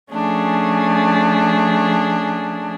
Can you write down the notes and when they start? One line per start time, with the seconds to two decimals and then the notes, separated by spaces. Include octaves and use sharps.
0.13 F3 A3 C#4 D4 G#4